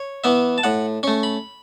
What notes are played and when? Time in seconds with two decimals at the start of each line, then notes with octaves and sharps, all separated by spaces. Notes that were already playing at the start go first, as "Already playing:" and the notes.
Already playing: C#5
0.24 E3 B3 E5
0.58 A5
0.63 A2 F#5
1.03 A3 C#4 C#6
1.23 B5